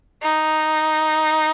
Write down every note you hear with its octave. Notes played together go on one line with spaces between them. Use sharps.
D#4